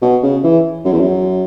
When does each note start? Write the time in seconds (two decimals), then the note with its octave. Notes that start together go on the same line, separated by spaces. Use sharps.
0.02 B2
0.23 C#3
0.44 E3
0.85 F#2
0.92 E2
1.00 F#2